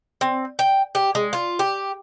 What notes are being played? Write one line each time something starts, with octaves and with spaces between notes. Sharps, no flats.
C4
G5
G4
G#3
F4
G4